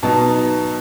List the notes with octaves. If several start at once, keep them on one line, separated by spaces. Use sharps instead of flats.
B2 F#3 B3 D#4 A5